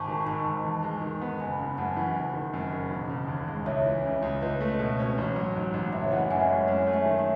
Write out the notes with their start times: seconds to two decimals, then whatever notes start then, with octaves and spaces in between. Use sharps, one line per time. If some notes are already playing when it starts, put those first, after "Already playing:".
Already playing: G#1 G#5 A5 B5 C#6
0.08 D#3
0.26 G#2 A5 C#6
0.45 G#1
0.64 E2
0.83 G#3
1.01 D#3
1.21 B3
1.40 F#1 G#5 B5
1.59 C#3
1.77 F#2 F#5 A5
1.97 E3
2.15 F#1
2.34 D#3
2.53 F#2
2.72 F#1
2.91 E1
3.09 C#3
3.28 D#2
3.47 G#3
3.66 C#2 C#5 E5
3.86 E3
4.04 C#3
4.22 C#2
4.41 C#2 B4 D#5
4.60 A3
4.79 B2
4.99 C#4
5.18 A1
5.36 F#3
5.56 G#2
5.74 A1
5.93 F#1 C#5 E5
6.12 E3 D#5 F#5
6.31 F#2 E5 G#5
6.49 G#3 C#5 E5
6.68 F#2 C#5
6.87 A3
6.93 E5 G#5
7.06 D#3
7.19 C#5 E5